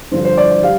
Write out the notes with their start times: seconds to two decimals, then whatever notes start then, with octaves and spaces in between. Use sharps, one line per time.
0.11 G2 D3 F3 C5
0.25 C5
0.38 D5
0.51 D5
0.63 G3 F5